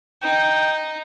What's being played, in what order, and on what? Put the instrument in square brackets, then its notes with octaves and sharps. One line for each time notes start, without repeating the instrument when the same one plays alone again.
[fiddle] D#4 [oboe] G5